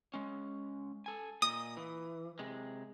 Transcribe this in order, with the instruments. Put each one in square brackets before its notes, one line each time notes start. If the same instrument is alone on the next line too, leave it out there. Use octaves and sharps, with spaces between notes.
[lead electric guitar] G#3 C#4
A4 G#5
[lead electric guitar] A#2 D#5 [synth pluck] D#6
[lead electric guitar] E3
C3 G#3